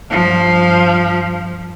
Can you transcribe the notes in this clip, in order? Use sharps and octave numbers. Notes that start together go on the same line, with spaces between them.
G2 F3